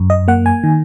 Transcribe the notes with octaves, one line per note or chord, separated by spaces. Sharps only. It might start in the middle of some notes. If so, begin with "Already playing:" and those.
Already playing: F#2
D#5
A#3 F#5
G#5
D#3